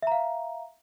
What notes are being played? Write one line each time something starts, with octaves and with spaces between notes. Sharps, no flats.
E5 F5 A#5